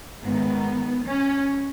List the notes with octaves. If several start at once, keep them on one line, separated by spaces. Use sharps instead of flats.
G#2 D#3 B3
C#4